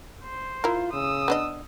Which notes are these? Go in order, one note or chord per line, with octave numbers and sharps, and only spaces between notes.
C5
E4 F4 A#4
C#3 D#6 E6
B3 D4 D#5